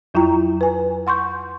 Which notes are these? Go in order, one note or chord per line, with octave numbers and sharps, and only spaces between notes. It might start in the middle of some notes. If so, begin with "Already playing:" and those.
F2 F#3 E4 F4 G5 A#5
B4 G#5
F#5 C6 C#6 G6